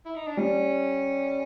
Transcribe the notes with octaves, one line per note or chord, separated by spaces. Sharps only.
E4
D#4
D4
G3 C#4